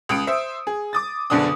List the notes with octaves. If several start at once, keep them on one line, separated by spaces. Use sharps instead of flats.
C#2 D#6 C#7 D7
C5 E5
G#4
D6 D#6 A6
F#1 B2 D3 D4 D#6